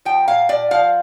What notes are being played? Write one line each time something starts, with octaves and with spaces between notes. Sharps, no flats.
F3 G5
A#2 F5
A#2 D5
F3 F5